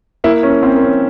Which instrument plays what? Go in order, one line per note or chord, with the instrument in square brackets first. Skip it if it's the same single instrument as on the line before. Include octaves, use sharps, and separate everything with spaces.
[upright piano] A#3 E4
C#4
A#3
C4
A#3
C#4